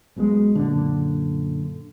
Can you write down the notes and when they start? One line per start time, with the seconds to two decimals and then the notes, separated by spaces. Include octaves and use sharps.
0.16 B1 B2 D#3 G#3
0.55 F#2 A#2 D3